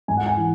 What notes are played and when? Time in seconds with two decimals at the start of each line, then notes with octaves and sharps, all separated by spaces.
0.08 G#2 G#5
0.17 F#5
0.26 G#5
0.37 E3